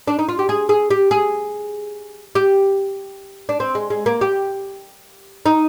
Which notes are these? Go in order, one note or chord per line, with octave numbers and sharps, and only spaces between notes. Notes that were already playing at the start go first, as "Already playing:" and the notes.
D4
D#4
F4
G4
G#4
G#4
G4
G#4
G4
D4
C4
G#3
G#3
A#3
G4
D#4